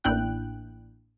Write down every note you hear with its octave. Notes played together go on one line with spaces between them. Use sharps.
A1 A#3 D4 E4 G5 F#6